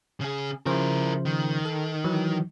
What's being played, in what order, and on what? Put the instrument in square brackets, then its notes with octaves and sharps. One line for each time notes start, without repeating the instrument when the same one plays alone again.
[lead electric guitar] C#3 G#4
[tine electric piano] C#3 F3 C5 [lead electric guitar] E4 A#4
[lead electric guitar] D#3
[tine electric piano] A4
E3 F#3